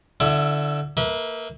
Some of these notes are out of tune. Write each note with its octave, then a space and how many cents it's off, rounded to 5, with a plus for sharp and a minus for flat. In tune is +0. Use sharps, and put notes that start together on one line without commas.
D3 +0 E4 +40 E5 +0
A#3 -20 B4 -35 E5 -35